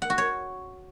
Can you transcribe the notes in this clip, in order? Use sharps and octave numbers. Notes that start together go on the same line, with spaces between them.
F#5
F#4
C#5